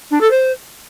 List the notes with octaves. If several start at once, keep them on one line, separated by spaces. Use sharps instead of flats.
D4
A4
C5